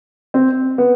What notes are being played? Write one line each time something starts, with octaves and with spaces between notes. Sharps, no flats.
C4
B3